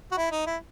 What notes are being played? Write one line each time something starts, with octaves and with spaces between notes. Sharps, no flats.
F#4
E4
D#4
E4